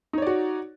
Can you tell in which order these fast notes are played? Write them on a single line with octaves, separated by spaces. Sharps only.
D#4 C#5 D5 F#4